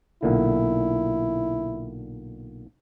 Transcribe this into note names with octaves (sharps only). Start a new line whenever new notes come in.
B1 A#2 D3 E4